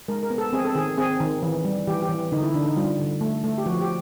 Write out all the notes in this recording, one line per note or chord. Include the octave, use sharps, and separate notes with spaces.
G#3 A#4
A#4
B3
A4
C4 G#4
A4
D#3 G#4
C4 G#4
D#3
E3
G3
E3 G4
G4
E3
D3 D#4
E4
D3 D4
D#4
G3 F4
D3
A3
A3
G4
F3 F#4
G4